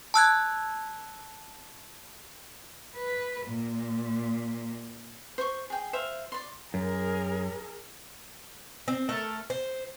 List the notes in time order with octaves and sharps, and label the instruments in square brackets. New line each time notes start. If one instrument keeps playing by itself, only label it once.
[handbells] A5 E6 F#6 G#6
[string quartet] B4
A#2
[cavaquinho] C5 C#6
G#4 G5
C5 E5 F5
D5 C6
[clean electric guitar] F#2 [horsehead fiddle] G#4 A#4
[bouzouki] C4
A3 A4 A#4
C5